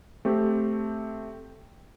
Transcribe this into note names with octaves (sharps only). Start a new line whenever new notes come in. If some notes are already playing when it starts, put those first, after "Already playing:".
A3 C4 G4